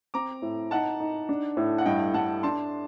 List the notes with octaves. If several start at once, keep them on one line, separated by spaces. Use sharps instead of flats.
C4 A#5 D6
A2
D#4 F#5 A5
D#4
D4
A2
F#5
G2 D#5 G5
G2 F#5 A5
D4 A5 C6